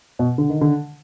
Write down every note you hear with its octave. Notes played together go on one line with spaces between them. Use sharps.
B2
D3
D#3
D3